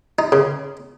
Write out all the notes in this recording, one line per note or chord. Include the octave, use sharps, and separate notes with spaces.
D#4
C#3